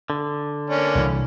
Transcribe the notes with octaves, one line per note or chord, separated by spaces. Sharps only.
D3
A#3 C#4 D4
C2 E3